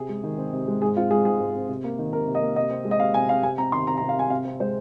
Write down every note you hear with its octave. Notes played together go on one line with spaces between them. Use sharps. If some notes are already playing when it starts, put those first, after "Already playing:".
Already playing: C3 G#4
G#3
D#3
C4
C3
G#3
G#2 G#4
C4 F4
G#3 G#4
G#2 G#4
G#2
C4
C3
A#3
D#3
C3 A#4
C3
D#5
A#3
C3 D#5
C4
G#3
D#5
C3 F5
C3 G#5
C4 F5
C3 G#5
C4 A#5
D#3 C6
C3 A#5
A#5
C3
F5
C4 G#5
C3 F5
C4
G#3 C5